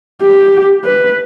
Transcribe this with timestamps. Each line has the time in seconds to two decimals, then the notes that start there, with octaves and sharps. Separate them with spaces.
0.22 G4
0.85 B4